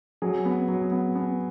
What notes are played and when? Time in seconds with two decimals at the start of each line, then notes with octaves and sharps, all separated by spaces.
0.22 F#3 G#4
0.45 B3
0.68 F#3
0.92 B3
1.15 B3